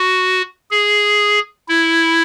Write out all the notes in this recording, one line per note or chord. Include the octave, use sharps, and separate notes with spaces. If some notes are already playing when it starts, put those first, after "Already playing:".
Already playing: F#4
G#4
E4